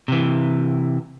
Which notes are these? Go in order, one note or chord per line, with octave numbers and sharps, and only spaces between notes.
C3 E3